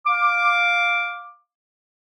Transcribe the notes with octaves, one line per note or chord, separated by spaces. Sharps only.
F5 D6